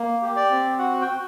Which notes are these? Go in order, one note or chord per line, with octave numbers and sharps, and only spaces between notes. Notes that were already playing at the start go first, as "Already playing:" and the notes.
Already playing: A#3
G4
D5
C4
F#4 F#5
G5
F#4